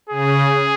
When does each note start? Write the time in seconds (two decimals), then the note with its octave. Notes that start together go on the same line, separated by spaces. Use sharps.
0.09 C#3 G#4